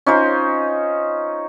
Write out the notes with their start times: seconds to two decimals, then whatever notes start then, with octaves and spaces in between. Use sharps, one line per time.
0.06 C#4 D#4 F4 C5